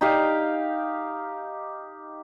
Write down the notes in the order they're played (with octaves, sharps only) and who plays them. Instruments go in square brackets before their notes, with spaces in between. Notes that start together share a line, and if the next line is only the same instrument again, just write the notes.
[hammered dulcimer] D#4 G4 F5